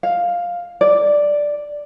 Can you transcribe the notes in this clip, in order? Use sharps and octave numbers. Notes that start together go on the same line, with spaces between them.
F5
D5